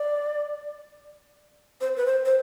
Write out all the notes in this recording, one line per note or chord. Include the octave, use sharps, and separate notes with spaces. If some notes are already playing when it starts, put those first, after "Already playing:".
Already playing: D5
C5
B4
C5
C5